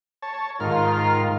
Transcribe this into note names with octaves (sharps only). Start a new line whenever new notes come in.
C#5 A5
G#2 D#3 F4 A#4 F6